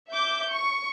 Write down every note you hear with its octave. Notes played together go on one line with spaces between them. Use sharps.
E5 D6 G6
C#6